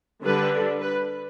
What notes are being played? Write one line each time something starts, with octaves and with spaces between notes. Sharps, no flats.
D3 G3 D4 B4
B4